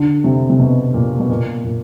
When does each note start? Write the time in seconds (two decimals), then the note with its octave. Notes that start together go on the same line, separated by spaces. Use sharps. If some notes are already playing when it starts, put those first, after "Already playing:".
Already playing: D3
0.24 C3
0.50 C3
0.59 B2
0.94 A#2
1.20 B2
1.29 A#2
1.64 A#2